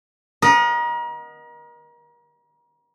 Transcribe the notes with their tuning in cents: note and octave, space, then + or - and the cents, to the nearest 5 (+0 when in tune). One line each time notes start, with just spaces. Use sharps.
A#4 +35 D#5 -15 F#5 +0